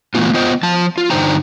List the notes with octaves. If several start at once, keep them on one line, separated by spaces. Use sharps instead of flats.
A#2 E3 A3 B3 F4
B3 F4 C5 D#5 G5
F3 A5
F4
G2 D3 D#4 C5 G5 A#5